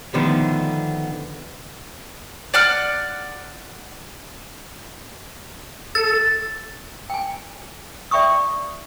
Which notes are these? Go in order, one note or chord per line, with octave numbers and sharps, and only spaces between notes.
B2 D3 D#3 F3 A3 B3
D5 F#5 F6
A4 A6
G5 G#5
D5 E5 G5 B5 C#6 D#6